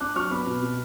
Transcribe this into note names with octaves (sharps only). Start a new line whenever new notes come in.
D4 D6 F#6
F#3 C#6 F6
B3 B5 D6
B2
B2